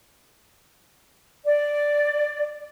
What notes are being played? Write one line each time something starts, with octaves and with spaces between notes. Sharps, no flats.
D5